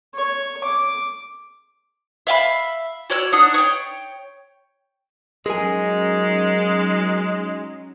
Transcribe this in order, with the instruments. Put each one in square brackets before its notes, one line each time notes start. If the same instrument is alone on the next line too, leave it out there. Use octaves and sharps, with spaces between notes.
[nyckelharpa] C#5
D6
[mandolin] E5 F5 G5 B5
F#4 C#5 D5 E6
D4 D#4 F#5 D#6
C#5 G5
[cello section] F#3 C#4 D#4 [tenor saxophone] G#3 [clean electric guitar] G#4 A#4 G#5